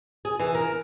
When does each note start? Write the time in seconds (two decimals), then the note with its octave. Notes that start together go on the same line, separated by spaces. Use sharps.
0.25 G#4
0.39 E3
0.55 A#4